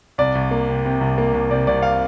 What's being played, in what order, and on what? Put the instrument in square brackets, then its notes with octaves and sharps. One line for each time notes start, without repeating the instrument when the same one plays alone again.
[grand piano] C2 D5
C2
A#3
C3
C3
C2
A#3
C2
C3 D5
C2 D5
F5